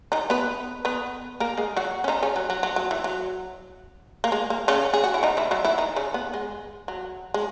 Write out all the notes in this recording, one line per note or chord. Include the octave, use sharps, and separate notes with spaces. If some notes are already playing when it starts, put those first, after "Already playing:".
D#3 D#4
B3 B4
B3 B4
A#3 A#4
G#3 G#4
F#3 F#4
C#4
D#3 D#4
C#3 C#4
F#3
F#3
F#3
F#3
E3
F#3
A#3
G#3
A#3
C#3 C#4
G#4
F#4
E4
D#3 D#4
E3 E4
F#3 F#4
E3 E4
D#3 D#4
C#3 C#4
B3
G#3
F#3
G#3